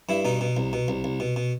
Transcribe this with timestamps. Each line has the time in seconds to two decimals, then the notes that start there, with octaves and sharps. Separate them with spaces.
0.09 G2 E4
0.25 B2 D#4
0.41 B2
0.57 C2
0.73 B2
0.88 C2
1.04 C2
1.20 B2
1.36 B2